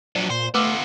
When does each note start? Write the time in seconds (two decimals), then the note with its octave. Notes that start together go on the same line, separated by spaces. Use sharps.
0.16 F3 F#3 D4 D5
0.30 A#2 C5
0.54 A3 B3 F4 B4 D6 E6